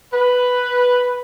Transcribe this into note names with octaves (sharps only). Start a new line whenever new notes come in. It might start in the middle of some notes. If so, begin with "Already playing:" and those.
B4